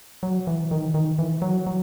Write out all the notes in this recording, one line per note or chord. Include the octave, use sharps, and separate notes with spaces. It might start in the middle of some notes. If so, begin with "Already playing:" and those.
F#3
E3
D#3
D#3
E3
F#3
F#3